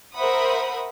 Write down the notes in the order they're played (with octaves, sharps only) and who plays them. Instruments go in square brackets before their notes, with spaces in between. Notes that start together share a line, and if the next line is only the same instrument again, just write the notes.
[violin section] A#4 C5 E5 F#5 B5 D#6